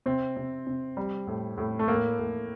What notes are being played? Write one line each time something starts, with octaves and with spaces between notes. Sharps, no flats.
C3 C4
C3
C3
G3
A2
A2
A3
A2 A#3
A2